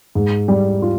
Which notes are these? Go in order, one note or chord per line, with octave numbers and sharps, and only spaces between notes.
G#2
G3
F4